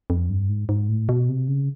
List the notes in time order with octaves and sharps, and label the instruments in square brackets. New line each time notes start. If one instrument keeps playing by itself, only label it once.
[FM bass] F2
G2
G#2
G#2
A2
B2
C3
C#3